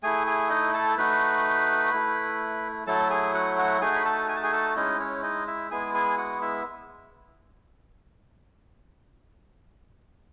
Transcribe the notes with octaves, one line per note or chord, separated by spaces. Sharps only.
A3 E4 G#4 G#5
G#4 G#5
D#4 D#5
A4 A5
A3 D#4 F#4 B4 B5
A3 E4
F#3 A3 E4 A4 A5
G#4 G#5
F#4 F#5
F#4 F#5
A3 D#4 F#4 G#4 G#5
B5
A4 A5
G#5
A5
G#4 G#5
A4 A5
G#3 C#4 D#4 E4 D#5
C#4 C#5
D#4 D#5
E4 E5
G#3 B3 E4 G#4 G#5
G#4 G#5
F#4 F#5
E4 E5